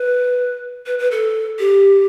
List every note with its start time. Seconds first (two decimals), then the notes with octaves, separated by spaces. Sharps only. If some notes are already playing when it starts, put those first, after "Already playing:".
Already playing: B4
0.86 B4
0.99 B4
1.11 A4
1.59 G4